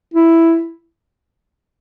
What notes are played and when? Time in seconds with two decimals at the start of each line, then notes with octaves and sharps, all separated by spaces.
0.14 E4